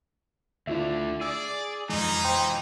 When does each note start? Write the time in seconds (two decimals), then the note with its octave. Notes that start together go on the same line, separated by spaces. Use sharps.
0.67 D2 D3 E4 F4 E5
1.21 G#4 D5 E6
1.90 F2 E3 G#3 D#4 F4
2.24 C5 G5 C6